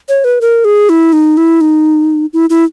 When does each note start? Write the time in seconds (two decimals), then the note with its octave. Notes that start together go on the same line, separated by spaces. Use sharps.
0.09 C#5
0.24 B4
0.41 A#4
0.65 G#4
0.89 E4
1.13 D#4
1.37 E4
1.61 D#4
2.33 E4
2.50 E4